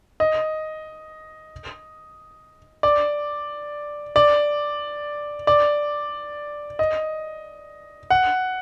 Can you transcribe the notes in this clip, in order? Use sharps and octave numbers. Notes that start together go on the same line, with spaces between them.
D#5
D5
D5
D5
D#5
F#5